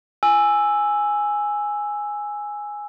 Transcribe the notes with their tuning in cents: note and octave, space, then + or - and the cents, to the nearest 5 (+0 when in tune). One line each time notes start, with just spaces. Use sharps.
G#5 +0 E6 +0